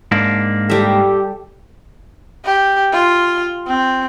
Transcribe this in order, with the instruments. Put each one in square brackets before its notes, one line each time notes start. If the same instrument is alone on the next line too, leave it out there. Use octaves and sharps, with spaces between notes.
[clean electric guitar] G#2 A#3 D4
[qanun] G3 E5 [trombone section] G4 A4
[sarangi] G4
F4
C4